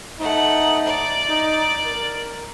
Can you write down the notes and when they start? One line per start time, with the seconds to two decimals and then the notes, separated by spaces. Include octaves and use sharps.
0.20 A3 D#4 F#5
0.86 D5
1.29 D#4
1.85 A#4